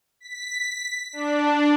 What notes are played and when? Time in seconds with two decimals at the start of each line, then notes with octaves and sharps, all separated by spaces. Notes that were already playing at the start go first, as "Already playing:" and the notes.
0.20 B6
1.13 D4